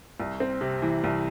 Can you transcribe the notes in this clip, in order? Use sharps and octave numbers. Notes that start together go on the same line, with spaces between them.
C2
C4
C3
E3
C2